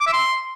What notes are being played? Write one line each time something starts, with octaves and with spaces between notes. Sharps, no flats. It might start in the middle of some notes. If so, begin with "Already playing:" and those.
D6
E5
C6